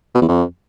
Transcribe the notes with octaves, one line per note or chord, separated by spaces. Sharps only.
B2
E2
F2